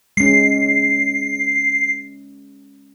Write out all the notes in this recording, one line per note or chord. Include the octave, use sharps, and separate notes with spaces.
G#3 C#4 C7